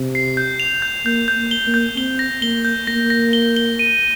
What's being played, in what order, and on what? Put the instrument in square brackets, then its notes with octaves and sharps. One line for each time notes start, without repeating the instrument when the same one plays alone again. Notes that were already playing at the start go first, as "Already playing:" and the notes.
Already playing: [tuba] C3
[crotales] C7
G6
F7
G6
[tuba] A#3 [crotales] G6
[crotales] G6
[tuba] A#3
[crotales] G7
[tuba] A#3
[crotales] G6
[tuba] C4 [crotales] G7
[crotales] A#6
[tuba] A#3 [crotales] G7
[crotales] G6
[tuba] A#3 [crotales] A#6
[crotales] A#6
G7
G7
D#7